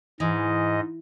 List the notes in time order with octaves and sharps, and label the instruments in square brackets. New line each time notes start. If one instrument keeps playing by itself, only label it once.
[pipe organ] G#2 D#5 [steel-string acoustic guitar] E3